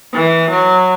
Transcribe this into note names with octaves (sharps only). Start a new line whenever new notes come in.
E3
F#3